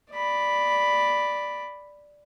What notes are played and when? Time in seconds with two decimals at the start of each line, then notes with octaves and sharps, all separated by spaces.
0.11 D5 B5